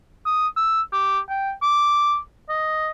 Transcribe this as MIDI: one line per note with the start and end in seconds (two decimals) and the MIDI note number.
0.26 0.48 87
0.56 0.81 88
0.93 1.19 67
1.29 1.52 79
1.62 2.17 86
2.49 2.91 75